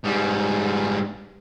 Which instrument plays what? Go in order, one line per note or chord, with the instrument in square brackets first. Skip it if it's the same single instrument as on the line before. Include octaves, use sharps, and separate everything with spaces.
[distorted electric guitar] G#2 G3